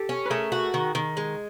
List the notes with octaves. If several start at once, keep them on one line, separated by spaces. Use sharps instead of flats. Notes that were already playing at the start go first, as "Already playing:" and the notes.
Already playing: G4 A4
C#4
B4
A3 G#4 A#4
F#4
D#3
D#3
G#3